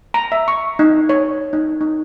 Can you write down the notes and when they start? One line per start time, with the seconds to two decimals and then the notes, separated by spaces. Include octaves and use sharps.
0.14 A#5
0.32 E5
0.48 C#6
0.79 D#4
1.09 C#5
1.53 D#4
1.81 D#4